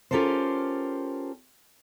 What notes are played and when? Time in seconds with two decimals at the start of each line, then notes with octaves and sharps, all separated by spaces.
0.11 C#4 F4 G4 A4 A#4 C5